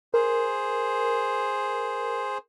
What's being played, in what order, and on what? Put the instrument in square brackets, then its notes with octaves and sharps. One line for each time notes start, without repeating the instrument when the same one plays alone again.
[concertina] G#4 C5 [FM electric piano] A#4